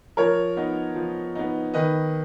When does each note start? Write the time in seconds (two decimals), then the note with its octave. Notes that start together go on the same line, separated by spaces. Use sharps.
0.17 F3 A#4 C#5
0.57 B3 D#4
0.96 F3
1.35 B3 D#4
1.74 D#3 B4 D#5